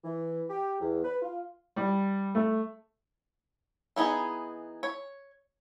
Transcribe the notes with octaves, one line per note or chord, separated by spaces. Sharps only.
E3
G4
E2
B4
F4
G3
A3
E3 B3 D#4 G#4
C#5